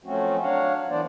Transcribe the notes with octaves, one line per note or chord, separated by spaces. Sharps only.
F3 F#3 A3 C4 C#4 F#4
F#3 D4 C#5 F5 F#5
E3 A#3 B3 D4 C5 D5